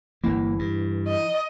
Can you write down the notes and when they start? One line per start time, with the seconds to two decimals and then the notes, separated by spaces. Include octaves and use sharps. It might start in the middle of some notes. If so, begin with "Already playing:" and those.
0.24 G1 E3 A#3
0.59 G2
1.08 D#5